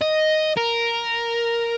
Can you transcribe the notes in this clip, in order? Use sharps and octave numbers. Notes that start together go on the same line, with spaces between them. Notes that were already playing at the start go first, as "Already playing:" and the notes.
D#5
A#4